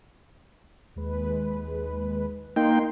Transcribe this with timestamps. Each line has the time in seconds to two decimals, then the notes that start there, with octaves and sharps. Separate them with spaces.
0.96 D#2 G#3 B4
2.56 A#3 D#4 G5 C6